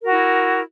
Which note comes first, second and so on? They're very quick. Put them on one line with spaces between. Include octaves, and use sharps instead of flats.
A#4 F#4 E4